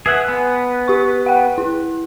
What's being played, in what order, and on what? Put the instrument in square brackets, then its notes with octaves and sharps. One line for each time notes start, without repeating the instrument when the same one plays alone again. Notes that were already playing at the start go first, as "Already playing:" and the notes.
[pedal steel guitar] G#4 E5 F#5 [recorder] B4
[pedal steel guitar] B3 [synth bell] G#5
[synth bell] G4 C#6
F#5 G5
E4